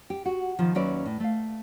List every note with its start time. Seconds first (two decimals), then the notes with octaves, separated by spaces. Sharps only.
0.10 G4
0.26 F#4
0.59 B2 D#3 F3
0.75 D#2 F#3 C#4 B4 D5 E5
1.06 A2
1.20 A3 F5